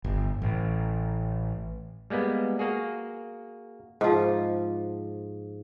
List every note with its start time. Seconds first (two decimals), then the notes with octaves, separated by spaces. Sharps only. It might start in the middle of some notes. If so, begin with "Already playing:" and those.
0.04 G1
0.42 A1
2.10 G3 G#3 A#3 B3
2.59 A#3 F#4 G#4
4.01 G#2 F3